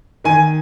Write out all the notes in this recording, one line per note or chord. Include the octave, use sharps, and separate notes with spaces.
D#3 G#5